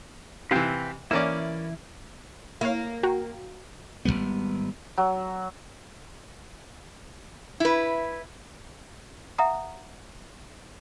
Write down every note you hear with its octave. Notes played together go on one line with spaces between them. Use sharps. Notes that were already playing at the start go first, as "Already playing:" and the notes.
C3 E3 B4 F5 G5
E3 A#3 C#4 E4 D5
A#3 E4 C#5 F5
F#4 G5 A#5
G#1 F#2 G3 B3
F#3
E4 B4
E5 F#5 A#5 D#6